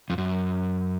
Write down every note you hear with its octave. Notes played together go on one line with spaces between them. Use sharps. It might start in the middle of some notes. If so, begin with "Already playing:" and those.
F2
F#2